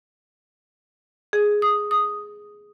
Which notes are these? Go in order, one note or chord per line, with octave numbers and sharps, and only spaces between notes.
G#4
D#6
D#6